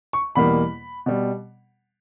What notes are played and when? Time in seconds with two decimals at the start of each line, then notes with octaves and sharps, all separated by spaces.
0.13 C#6
0.35 E2 B2 G3 A#3 B5
1.06 B2 G3